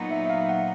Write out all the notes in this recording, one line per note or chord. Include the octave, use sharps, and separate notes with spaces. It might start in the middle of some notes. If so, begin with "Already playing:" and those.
Already playing: A#2 F#3 B3 D#4
E5
E5
F5
F#5